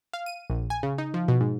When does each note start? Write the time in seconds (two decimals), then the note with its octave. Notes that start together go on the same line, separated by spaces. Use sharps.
0.13 F5
0.26 D#7
0.50 A#1
0.70 G#5
0.83 C#3
0.98 D#4
1.14 F3
1.28 B2
1.41 G#2